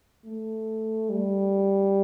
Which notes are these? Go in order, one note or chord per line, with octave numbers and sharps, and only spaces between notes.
A3
G3